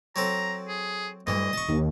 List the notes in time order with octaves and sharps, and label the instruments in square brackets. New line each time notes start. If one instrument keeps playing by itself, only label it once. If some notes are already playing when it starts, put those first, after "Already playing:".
[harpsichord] F#3 C4 A4 [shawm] A#5
[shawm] G#4
[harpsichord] D2 E3 [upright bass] G2 G3 [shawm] D#5
[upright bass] F1 F2 [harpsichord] A5 C#6
[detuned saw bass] D#2 [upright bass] C4 D4